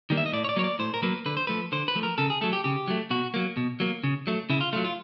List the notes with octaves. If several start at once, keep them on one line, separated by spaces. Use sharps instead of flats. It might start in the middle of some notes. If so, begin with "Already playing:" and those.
D#3 G3 A#3
E5
D#5
A2 D5
C#5
D5
F#3 A#3 C#5
D5
A2 C5
A#4
F#3 A#3 B4
D3 B4
C5
F3 A3 B4
D3 C5
B4
F3 A3
A#4
C#3 A4
G#4
F#3 A3 A4
G4
C#3 G4
F#3 A3
B2 F#4
F#3 A#3
B2
F#3 A#3
C#3
F#3 A3
C#3 E4
F4
F#3 A3 F4
F4